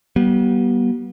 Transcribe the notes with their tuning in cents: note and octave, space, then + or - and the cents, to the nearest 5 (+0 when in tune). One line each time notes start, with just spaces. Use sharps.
G3 -40 B3 -40